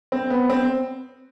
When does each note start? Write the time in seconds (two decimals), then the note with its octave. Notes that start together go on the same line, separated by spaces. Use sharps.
0.12 C4
0.30 B3
0.50 C4